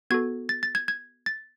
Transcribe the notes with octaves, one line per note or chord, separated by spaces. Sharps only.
B3 F#4 A4 G#6
A6
A6
G#6
G#6
A6